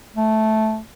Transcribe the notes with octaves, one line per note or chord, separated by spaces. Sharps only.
A3